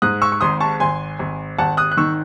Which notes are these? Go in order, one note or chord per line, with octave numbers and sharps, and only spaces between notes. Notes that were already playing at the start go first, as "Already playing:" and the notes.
G#2 D#6 F#6
C#6 E6
C#6
G#1 C6 D#6
A5 C#6
G#1 G#5 C6
G#1
G#1 F#5 A5
D#6 F#6
F#6
D#3 C#6 E6